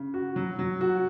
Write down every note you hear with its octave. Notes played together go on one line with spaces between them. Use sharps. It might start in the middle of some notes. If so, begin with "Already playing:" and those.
Already playing: C#3
F#4
F#3
F#3
F#4